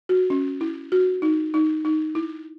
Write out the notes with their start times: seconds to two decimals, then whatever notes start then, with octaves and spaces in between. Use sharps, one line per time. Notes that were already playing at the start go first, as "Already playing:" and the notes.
0.09 F#4
0.30 C#4
0.61 E4
0.92 F#4
1.22 D#4
1.54 D#4
1.85 D#4
2.15 E4